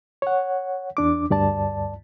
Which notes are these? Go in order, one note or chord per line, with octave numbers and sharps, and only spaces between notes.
C#5 F#5
E2 D4 D6
D2 G2 D5 A5